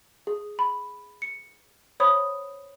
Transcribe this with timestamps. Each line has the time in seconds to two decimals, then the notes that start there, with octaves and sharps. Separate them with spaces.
0.27 G#4
0.59 B5
1.22 C#7
2.00 C5 C#5 B5 D#6